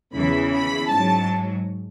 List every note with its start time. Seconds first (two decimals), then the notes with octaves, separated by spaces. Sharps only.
0.14 E2 C#3 E3 B5
0.52 B5
0.89 G#2 F#3 A5